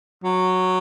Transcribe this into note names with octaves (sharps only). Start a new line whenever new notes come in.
F#3